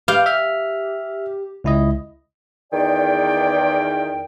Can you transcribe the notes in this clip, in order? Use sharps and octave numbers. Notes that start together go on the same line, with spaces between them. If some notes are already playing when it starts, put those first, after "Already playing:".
G4 B4 F5 D6 G6
E5 F6
C#2 E4 D#5
E2 D#3 D5 G5